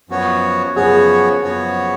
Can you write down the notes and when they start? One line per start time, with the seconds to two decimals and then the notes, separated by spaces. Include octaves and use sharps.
0.09 F#2 F3 B3 F#4 C#5
0.75 F#2 F3 B3 F#4 G#4 C#5
1.42 F#2 F3 B3 F#4 C#5